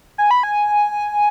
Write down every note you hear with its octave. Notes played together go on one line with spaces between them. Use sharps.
G#5
B5
G#5